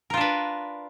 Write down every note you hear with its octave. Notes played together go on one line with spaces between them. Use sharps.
D4 F4 A#4 B4